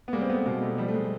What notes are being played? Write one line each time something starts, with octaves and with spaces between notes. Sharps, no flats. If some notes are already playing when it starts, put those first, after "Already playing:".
B3
G3 G#3 A#3
C4
A3 B3
B2 G#3 A#3
G3 A3
F3 G3
A3
G#3